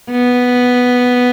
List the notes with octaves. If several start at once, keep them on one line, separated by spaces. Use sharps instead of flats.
B3